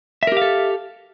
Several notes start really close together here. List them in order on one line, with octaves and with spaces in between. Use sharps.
E5 A#4 G4 F5 A4